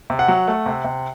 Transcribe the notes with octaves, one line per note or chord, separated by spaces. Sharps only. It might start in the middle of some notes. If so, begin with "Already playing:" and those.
C3
F#5
F#3
A3
C3
C3